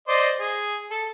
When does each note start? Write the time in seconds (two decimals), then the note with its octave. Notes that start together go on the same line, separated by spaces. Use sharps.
0.08 C5 D5 D#5
0.40 G#4
0.91 A4